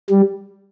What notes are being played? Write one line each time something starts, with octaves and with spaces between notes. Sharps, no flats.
G3